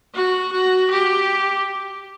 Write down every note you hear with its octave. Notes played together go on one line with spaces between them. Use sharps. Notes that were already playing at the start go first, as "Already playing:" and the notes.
F#4
F#4
G4